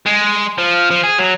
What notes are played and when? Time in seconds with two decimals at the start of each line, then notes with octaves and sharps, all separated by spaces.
0.06 G#3
0.58 F3
0.91 F3
1.03 G#4
1.19 F#3